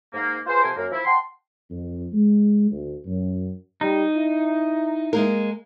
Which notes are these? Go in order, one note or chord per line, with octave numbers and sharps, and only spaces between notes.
G#2 A#3
F4 G#4 B4 C5
C3 F3 A4 A#4 C5 G#5
F#2 A#3
F3 E4
F#5 G5 A5 C6
F2
G#3
D2
F#2
G3 D#4
E4
G#3 A#3 A#4